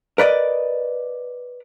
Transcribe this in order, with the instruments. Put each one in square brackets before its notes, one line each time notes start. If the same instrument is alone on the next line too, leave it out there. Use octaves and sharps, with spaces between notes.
[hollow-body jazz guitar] A#4 B4 D5 D#5